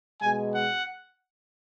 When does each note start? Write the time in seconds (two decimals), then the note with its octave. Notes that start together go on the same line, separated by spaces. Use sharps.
0.22 B2 G#3 G#5
0.55 F#5